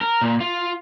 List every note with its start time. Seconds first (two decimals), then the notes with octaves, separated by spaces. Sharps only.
0.01 A#4
0.22 A#2
0.40 F4